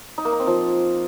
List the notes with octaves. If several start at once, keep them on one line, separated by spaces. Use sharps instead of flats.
D#4
A#3
D#4
C4
F3